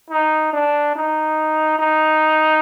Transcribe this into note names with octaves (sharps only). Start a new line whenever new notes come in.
D#4
D4
D#4
D#4